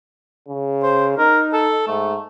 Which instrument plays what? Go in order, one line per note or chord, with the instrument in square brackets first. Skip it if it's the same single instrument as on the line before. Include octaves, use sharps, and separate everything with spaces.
[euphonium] C#3
[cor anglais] C5
[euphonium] D#4 [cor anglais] A#4
[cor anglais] A4
[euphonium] G#2 [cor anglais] A3